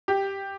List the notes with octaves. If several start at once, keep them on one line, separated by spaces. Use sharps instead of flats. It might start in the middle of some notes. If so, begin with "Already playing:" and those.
G4